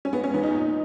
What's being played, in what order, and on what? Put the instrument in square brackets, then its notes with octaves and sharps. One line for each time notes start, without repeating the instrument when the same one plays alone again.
[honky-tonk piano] C#4
G#3 B3
C#4
E2 B3
D#4
A#2